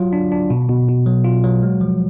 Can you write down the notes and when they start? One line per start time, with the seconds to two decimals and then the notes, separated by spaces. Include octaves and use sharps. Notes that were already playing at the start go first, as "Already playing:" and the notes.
Already playing: F#3 F4
0.13 D4
0.32 D4
0.50 B2
0.69 B2
0.88 B2
1.06 F#3
1.25 F4
1.44 F#3
1.63 G#3
1.81 F3